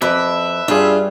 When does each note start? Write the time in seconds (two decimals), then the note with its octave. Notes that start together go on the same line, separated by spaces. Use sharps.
0.02 F2 B4 E5 D6
0.68 G2 G3 D4 F4 G#4